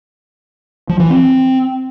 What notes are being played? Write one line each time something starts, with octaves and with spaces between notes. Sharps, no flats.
F3
E3
C4